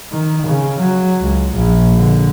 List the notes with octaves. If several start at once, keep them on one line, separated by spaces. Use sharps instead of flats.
D#3
C#3
F#3
C#2
A#1
D3